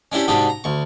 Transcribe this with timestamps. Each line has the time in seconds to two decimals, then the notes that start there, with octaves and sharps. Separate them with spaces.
0.12 C#4 D4 E4 G4 C5
0.28 G#2 C3 D4 D#4 F#4 G4
0.49 A#5
0.64 D2 C#6